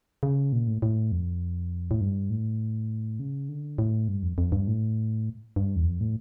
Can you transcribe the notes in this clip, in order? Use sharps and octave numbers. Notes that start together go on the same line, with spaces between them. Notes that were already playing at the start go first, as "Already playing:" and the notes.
C#3
A#2
A2
A2
F2
A2
G2
A2
C#3
D3
A2
G2
F2
F2
G2
A2
G2
E2
F2
A2